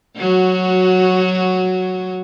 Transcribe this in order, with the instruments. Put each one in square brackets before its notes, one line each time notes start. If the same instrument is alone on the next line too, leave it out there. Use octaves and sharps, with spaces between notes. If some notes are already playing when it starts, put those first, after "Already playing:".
[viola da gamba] F#3 F#4